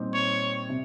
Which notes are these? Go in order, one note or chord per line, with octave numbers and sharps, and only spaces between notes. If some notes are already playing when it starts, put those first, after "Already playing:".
Already playing: A#2 G3 C4 D#4 G4
C#5
C3